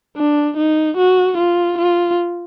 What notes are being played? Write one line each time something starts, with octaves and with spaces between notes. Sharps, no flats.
D4
D#4
F#4
F4
F4